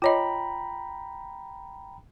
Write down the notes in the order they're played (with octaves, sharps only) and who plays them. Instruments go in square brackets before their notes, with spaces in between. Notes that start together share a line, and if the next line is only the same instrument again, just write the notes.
[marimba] F4 C#5 D#5 [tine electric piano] G5 A#5 B5